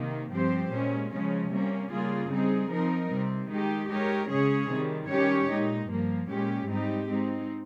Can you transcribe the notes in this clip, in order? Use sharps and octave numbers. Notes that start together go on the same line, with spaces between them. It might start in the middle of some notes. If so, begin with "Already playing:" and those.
Already playing: C3 D#3 A#3
G2 F3 C4 G4 C5
A#2 G#3 C#4
C#3 F3 G#3 C#4
C3 G3 A#3 C#4
C#3 G3 A#3 F4 G#4
G3 C4 D#4 G#4
F3 C4 D#4 A#4
C3 G3 C4
D#3 G#3 D#4 G4
G#3 D#4 G4 A#4 C#5
C#3 G#3 C#4 G#4 C#5
C3 D#3 G3
D#3 G3 C#4 G4 C#5
A#2 G#3 D#4
G2 F3 A#3
A#2 G#3 C#4 G4
G#2 G3 C4 D#4 G4
G#3 C4 D#4